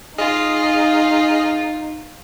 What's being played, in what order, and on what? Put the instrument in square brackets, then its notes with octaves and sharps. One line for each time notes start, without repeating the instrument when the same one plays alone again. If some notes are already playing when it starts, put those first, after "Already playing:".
[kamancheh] D#4 [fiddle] F4 [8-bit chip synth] G#4 D#5 F6